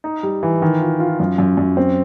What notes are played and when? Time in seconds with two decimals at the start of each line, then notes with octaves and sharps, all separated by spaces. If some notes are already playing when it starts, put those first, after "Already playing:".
0.04 D#4
0.23 G3
0.43 E3
0.62 D#3
0.81 F4
1.00 F4
1.20 F#2
1.38 F#2
1.57 F#2
1.77 C4